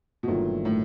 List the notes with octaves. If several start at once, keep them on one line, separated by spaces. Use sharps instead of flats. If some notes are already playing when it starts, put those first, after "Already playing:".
B2
G1 G2 A#2 D#3 F#3 A3
A2